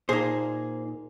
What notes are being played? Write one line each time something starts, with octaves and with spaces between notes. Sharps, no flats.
A#2 A#3 D#4 G#4 C5